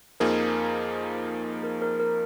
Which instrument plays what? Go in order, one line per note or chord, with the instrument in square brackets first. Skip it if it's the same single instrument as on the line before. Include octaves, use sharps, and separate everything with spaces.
[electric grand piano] F2 F3 A#3 D#4 G#4 [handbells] A#4
[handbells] A#4
A#4
A#4